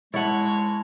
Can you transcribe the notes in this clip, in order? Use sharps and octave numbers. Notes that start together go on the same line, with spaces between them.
G#3 E4 C#5 F#5 A5 C#6 A6